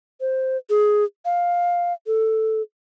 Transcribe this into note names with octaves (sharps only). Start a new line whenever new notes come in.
C5
G#4
F5
A4